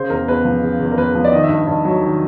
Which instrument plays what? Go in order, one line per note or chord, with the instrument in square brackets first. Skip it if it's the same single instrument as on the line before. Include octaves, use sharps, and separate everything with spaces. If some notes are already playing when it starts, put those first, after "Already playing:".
Already playing: [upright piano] C#3 C5
E2 A#4
E2 B4
F3
C#3
E2
A#4
E2 B4
F3
D5
D#3 D#5
E5
G2
G2
F#3
D#3